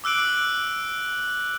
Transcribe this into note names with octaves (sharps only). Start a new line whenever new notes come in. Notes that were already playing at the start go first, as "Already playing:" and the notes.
D6 E6 F#6 D7 F#7